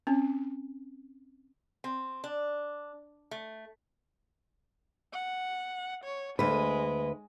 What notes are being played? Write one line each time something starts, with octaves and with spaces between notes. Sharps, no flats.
C4 C#4
C4
D4
A3
F#5
C#5
D2 G#3 B4